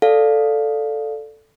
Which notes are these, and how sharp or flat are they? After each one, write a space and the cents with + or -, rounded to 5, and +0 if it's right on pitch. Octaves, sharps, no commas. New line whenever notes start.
A4 +0 D5 +0 F5 +10